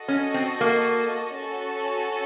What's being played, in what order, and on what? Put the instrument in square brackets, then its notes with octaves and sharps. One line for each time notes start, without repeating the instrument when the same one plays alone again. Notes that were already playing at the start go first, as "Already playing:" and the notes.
Already playing: [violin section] F#4 A4 D#5
[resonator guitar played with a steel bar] C#4
C4
A#3
[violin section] C#4 F#4 A4